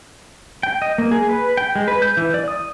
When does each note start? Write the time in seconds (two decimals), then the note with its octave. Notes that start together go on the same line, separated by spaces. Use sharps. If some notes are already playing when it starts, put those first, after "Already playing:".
0.63 G5
0.82 D#5
0.98 A#3
1.11 G#4
1.29 B4
1.57 G5
1.76 G#3
1.88 B4
2.02 G6
2.17 E3
2.34 D5
2.48 D#6